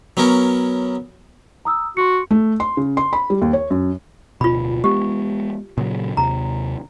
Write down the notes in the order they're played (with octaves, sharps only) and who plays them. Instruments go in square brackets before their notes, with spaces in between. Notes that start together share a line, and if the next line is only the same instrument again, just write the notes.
[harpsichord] F#3 B3 C#4 A#4 C#5
[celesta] A#5 D#6 E6
[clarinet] F#4 [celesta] C6 C#7
[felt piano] A3
C6
C#3
C6
B5
G3
D#2
C#5
F#2
[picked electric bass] D1 B2 [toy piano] F4 B5
[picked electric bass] G#3 B3 [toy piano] G4
[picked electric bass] A#2 C#3 F#3
[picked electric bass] D#2 C3 [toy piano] A#5